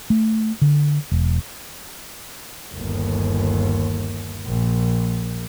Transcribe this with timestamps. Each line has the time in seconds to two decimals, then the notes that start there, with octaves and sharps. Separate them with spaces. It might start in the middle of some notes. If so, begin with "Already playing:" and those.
0.10 A3
0.62 D3
1.12 E1
2.72 G1 D#2
4.46 A#1